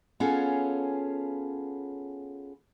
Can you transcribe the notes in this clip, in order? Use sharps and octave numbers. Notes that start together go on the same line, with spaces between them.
B3 C#4 F4 G#4 A4